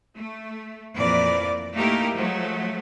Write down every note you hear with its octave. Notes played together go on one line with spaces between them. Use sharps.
A3
F2 A#2 E3 A#4 D5
A3 A#3 D#4 E4 G4 A#4
F3 F#3 G#3 A3